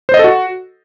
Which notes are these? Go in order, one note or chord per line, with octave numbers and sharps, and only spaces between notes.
C5
D#5
A4
F#4